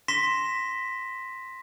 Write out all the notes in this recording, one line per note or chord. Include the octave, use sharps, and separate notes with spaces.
C6 A#6 B6 E7